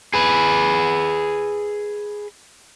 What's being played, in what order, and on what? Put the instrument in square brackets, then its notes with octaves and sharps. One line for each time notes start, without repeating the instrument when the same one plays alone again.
[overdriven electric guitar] G#4 B4